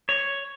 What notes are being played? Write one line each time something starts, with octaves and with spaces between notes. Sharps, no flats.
C#5